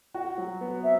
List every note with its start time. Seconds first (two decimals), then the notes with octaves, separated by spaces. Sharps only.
0.14 F#4
0.38 F#3
0.61 B3
0.84 C4 E5